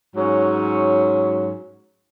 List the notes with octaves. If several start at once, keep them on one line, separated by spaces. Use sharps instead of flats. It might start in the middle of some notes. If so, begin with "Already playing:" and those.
G#2 F#3 C#4 C#5